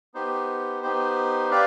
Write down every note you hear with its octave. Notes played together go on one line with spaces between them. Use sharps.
B3 D#4 G4 C5
B3 D#4 G4 C5
D4 G4 B4 D5 F5